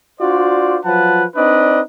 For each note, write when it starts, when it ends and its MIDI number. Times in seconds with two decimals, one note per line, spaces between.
0.21 0.78 62
0.21 0.78 65
0.21 0.78 66
0.21 0.78 72
0.21 0.78 74
0.84 1.25 53
0.84 1.25 54
0.84 1.25 65
0.84 1.25 71
0.84 1.25 78
0.84 1.25 81
1.36 1.81 60
1.36 1.81 62
1.36 1.81 63
1.36 1.81 71
1.36 1.81 74
1.36 1.81 75